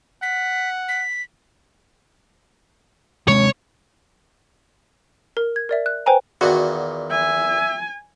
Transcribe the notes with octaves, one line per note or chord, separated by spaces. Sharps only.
F#5 B6
B6
C3 G#3 C4 C#5
A#4
G#6
A#4 D5 E5
F#6
B4 C5 G5 G#5 A#5
E2 A#2 D#3 F#4
E5 G#5